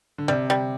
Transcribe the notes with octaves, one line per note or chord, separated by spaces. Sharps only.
D3
C3 G3
G3